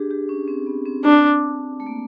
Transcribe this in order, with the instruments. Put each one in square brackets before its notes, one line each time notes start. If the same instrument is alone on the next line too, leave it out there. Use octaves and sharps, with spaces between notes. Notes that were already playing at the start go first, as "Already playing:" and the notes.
Already playing: [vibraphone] D4 G4 G#4
G4
C#4
C4
B3
C4
[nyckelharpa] D4
[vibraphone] A3
A#3